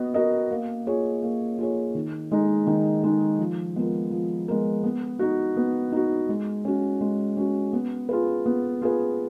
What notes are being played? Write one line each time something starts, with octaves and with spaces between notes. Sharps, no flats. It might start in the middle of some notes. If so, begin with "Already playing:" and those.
Already playing: B3 F#4 D#5
F#4 A#4 D#5
A#3
F4 G#4 C#5
A#3
F4 G#4 C#5
D#3
G#3 D#4
D#3
G#3 D#4
F3
G#3 B3 F4 A#4
F3
G#3 B3 F4 A#4
B3
D#4 F#4
B3
D#4 F#4
G#3
C#4 F#4
G#3
C#4 F#4
B3
F4 G#4 B4
B3
F4 G#4 B4